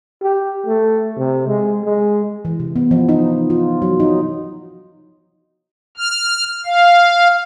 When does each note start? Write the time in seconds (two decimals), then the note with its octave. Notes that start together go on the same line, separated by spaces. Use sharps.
0.22 G4
0.66 A3
1.17 C3
1.47 G#3
1.84 G#3
2.45 E3
2.60 C3
2.76 B3
2.91 F3
3.09 D#4
3.50 F4
3.82 F#3
4.00 D#4
5.97 F6
6.66 F5